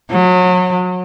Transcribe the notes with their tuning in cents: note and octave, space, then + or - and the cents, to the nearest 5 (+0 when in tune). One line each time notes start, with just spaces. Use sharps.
F#3 -30